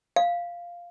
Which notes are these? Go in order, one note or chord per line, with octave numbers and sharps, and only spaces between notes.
F5